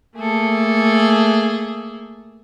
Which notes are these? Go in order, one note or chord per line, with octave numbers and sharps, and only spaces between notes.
A3 A#3 G#4 A4